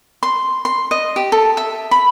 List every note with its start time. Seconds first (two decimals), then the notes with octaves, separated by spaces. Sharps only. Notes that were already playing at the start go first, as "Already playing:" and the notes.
0.23 C6
0.65 C6
0.91 D#5
1.16 G4
1.32 A4
1.57 E5
1.91 B5